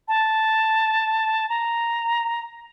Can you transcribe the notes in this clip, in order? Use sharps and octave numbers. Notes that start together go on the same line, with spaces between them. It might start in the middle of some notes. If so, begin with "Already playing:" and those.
A5
A#5